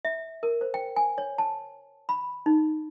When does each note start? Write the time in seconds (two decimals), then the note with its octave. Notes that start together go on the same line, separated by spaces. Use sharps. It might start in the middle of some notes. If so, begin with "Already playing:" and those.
0.05 E5
0.43 A#4
0.61 C5
0.74 G5
0.96 G#5
1.18 C#5
1.38 A5
2.09 B5
2.46 D#4